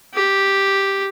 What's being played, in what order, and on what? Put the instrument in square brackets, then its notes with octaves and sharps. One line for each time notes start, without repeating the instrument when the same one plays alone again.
[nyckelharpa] G4